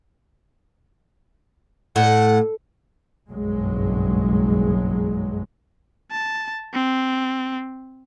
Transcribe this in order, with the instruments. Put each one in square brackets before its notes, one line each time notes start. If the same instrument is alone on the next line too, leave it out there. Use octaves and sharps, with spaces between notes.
[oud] A2 [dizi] F#5
[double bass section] F#1 B1 G2 F#3 G#3
[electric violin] A5
C4